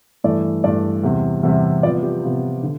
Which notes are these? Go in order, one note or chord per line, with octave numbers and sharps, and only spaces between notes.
G2 E3 A3 D5
G2 E3 A3 D5
E2 C3 G3
E2 C3 G3 E5
C3 F3 B3 F4 D5
G4
C3 F3 B3 F4
D3